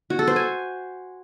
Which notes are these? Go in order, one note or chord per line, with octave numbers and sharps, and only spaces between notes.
F#4
A4
C5
G#5